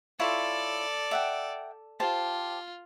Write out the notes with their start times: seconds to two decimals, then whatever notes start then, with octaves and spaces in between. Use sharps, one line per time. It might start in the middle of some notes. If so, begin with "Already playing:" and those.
0.20 E4 F4 A4 C#5 D5
1.11 E5 F#5 G5
2.00 F4 G4 C5 A5